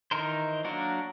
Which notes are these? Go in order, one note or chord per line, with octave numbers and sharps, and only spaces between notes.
D#3 E3 D#4 A#4 C5
F#3 A#3 D4 F#4 A#4